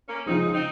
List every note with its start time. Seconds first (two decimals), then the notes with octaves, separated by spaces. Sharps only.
0.09 A#3 C#4
0.26 C#3 F3 G#3 C4 D#4
0.53 C4 D#4